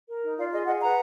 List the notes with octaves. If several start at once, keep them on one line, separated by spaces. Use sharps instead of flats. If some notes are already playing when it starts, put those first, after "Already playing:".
A#4
D#4
F4 D5 F5
G#4 D#5
G#4 D#5 F#5
B4 F#5 A#5